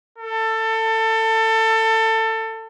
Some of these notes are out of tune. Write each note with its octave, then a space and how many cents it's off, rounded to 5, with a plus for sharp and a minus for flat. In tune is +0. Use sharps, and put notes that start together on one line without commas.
A4 +25